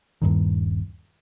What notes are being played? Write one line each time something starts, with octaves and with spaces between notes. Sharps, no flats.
D#1 G2 D#3